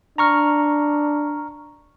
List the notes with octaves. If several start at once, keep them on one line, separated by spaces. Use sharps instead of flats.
D4 A#5 C#6 F6